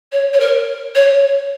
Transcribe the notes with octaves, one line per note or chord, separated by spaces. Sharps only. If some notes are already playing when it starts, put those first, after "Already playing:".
C#5
C#5
A#4
C#5